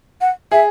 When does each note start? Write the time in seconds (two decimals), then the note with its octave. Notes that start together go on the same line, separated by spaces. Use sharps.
0.21 F#5
0.51 G#4 E5